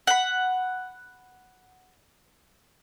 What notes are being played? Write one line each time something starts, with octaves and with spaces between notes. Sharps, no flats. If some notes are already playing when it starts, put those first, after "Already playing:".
F#5 B5